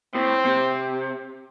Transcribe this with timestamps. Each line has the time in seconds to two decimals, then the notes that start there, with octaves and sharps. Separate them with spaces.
0.15 A2 C4
0.45 C3